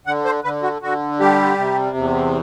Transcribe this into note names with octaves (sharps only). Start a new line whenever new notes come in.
D3 F#5
C5
D3 B4
F#4
D3 F#4
G3 G4
C3
E2